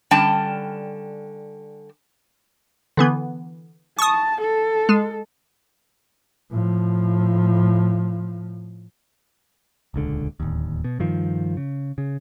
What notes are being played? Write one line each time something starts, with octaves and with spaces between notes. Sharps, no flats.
D3 G3 C#4 G5 A5
D3 E3 B3
A5 C#6 D#6
A4
G#3
A2 F3
D#1 C#2 D3
D1 D#2
B2
G2 D#3 F3
C#3
C#3